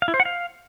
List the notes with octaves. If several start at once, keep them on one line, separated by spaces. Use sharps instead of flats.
F5
E4
C5
F#5
F5